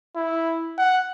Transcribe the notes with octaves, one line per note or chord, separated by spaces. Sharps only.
E4
F#5